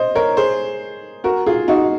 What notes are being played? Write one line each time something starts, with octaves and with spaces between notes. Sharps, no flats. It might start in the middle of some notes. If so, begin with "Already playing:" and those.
Already playing: C5 D#5
A#4 C#5
G#4 C5
F#4 A#4
F4 G#4
D#4 F#4